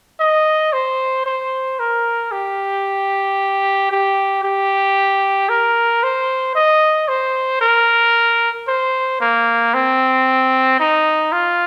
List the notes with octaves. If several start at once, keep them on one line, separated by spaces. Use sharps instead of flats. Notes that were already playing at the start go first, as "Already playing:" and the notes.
D#5
C5
C5
A#4
G4
G4
G4
A#4
C5
D#5
C5
A#4
C5
A#3
C4
D#4
F4